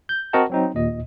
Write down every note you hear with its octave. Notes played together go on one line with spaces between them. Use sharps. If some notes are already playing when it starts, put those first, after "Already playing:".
G6
C4 F#4 A#4 D#5 F#5 A5
F#3 C4 D#4
D#2 A#2 D#5